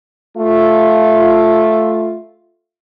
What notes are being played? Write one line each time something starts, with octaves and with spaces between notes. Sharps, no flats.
A3 F4